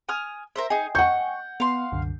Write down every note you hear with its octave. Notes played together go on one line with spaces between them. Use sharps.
G#5 D#6 F6
A#4 C5 E5
D#4 G#4 D#5 G5 G#5
F#5 C#6 G6
B3 F5 C6
C2 F#2 D3